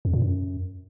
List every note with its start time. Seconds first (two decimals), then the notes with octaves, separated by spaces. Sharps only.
0.05 F2
0.13 A#2
0.22 F#2